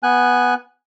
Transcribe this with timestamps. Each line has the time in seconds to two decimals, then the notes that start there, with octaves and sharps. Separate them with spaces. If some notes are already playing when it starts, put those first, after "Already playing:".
0.03 B3 G#5 F#6